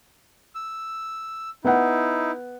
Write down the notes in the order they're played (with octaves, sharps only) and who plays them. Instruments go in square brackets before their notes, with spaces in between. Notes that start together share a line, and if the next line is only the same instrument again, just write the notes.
[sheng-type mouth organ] E6
[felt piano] B3 F#5 [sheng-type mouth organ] D#4 E4